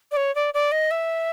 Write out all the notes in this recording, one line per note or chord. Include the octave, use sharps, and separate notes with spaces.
D5
C#5
D5
D5
D#5
E5